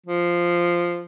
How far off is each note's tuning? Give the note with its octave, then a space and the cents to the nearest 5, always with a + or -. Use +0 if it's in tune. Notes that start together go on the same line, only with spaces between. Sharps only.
F3 -5